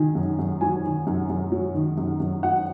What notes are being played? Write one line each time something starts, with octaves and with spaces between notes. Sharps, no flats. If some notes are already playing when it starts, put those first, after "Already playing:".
Already playing: D#3 F#3 G#5
F#2
F#2
F#3 G#5
D#3
F#2
F#2
F#3
D#3
F#2
F#2
F#3 F#5